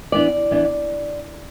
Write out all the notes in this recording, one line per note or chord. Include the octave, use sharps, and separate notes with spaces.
E3 B3 D4 D5
E3 B3 D4